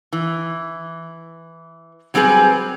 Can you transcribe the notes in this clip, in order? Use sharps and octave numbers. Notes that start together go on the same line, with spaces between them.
E3
F#3 G3 C4 F4 G#4 B4